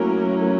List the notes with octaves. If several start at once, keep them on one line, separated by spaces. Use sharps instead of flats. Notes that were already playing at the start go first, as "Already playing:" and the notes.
Already playing: F#3 A3 A#3 C#4 E4 A#4